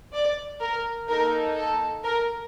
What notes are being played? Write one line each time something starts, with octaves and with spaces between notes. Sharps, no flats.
D5
A#4
A#3 D#4 A4 A#4
A4
A#4